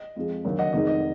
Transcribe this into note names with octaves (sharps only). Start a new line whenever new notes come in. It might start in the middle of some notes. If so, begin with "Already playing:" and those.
Already playing: D#5
F2 F3 G#3
D#2 D3 F#3
D#5 F#5
F1 F2 D#3 G#3 D#5
D#5